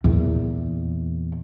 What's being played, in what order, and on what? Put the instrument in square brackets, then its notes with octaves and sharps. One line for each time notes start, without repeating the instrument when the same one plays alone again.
[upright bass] E2 A#2